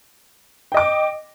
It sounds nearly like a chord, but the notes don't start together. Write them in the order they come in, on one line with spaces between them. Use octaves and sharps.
G5 D#5 D6